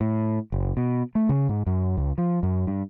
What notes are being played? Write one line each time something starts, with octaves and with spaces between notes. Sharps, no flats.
A2
F#1
B2
A3
C#3
G#2
F#2
C#2
F3
F#2
G2